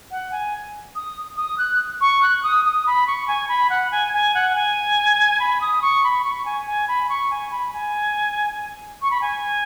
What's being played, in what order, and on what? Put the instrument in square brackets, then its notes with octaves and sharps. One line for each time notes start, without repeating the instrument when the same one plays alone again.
[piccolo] F#5
G#5
D#6
D#6
F#6
C#6
F#6
D#6
D#6
B5
C#6
G#5
B5
F#5
G#5
G#5
F#5
G#5
B5
D#6
C#6
B5
C#6
G#5
G#5
B5
C#6
G#5
B5
G#5
C#6
B5
G#5